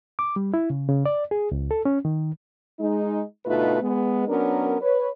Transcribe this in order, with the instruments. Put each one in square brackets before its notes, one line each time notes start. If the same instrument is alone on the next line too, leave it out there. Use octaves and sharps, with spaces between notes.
[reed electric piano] D6
G3
E4
C#3
C#3
D5
G#4
C#2
A4
C#4
D#3
[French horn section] G#3 D#4
D2 B2 A3 D#4 F4 B4
G#3 B3
F#3 B3 C#4 D4 A#4
B4 C#5